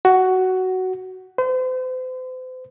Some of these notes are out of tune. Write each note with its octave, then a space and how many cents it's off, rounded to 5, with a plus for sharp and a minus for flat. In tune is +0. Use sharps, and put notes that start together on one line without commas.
F#4 +10
C5 -40